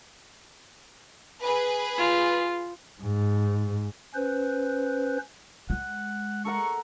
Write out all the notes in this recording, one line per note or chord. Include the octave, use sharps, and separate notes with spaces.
G#4 B4
F4
G#2
C#4 B4 C5
G#3 F#5
A4 A#4 F#5 C#6